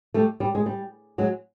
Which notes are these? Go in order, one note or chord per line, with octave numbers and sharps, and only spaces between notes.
G3 A3
G3
G#3
G3
F#3 G#3